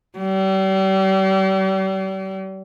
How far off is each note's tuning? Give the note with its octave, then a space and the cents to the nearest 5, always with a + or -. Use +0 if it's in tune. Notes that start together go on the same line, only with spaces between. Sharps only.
G3 -40